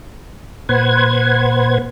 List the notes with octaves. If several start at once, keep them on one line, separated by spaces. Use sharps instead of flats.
A#2 B4 C5 F#5 G#6